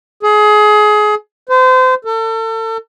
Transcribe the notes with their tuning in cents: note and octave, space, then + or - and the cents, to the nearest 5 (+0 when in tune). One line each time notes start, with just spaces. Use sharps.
G#4 +25
C5 -30
A4 +35